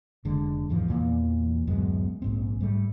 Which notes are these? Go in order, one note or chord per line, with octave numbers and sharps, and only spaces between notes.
F1 D3 G#3
E2 G#2 E3 F3
E2 A#2 E3
D1 F#2 G#3 B3
A#1 G#2 C4
G#2 G3 A3